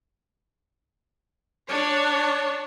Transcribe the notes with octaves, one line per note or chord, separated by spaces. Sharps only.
D4 C#5